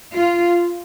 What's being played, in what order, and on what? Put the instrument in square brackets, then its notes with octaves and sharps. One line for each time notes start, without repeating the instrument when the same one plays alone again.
[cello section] F4